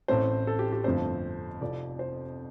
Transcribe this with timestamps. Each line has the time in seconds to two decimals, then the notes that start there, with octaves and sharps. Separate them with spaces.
0.08 A1 A2 A3 C4 C5
0.47 A4
0.59 G4
0.73 G4
0.84 G1 F2 F3 A3 C4 C5
1.61 F1 F2 F3 D5
1.99 C5